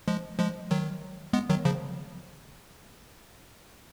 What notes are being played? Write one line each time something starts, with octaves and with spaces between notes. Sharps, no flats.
F3 G#3
F3 G#3
D#3 F#3
G#3 B3
D#3 F#3
C#3 F3